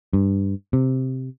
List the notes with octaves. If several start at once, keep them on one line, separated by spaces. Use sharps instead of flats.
G2
C3